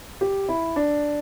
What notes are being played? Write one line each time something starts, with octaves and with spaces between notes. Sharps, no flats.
G4
E4
D4